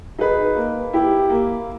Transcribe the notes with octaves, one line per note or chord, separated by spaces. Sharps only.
D#4 G#4 B4
A#3
E4 G4
A#3